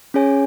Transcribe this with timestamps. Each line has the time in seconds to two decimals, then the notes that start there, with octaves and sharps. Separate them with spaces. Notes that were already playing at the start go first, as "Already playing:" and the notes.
0.14 C#4 G#4 C#5 G#5